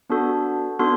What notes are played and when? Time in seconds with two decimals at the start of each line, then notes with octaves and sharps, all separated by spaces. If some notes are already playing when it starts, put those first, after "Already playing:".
0.09 B3 D4 F#4 A4
0.79 B3 D4 F#4 A4 C6